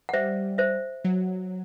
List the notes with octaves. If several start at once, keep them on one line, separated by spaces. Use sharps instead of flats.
F#5
G3 C5 E5
C5 E5
F#3